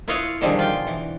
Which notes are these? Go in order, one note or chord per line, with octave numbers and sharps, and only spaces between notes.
E4 F4 B4 C#5 D#5 F5
B2 D3 D#3 F3 G3 G#3
F4 G5
E3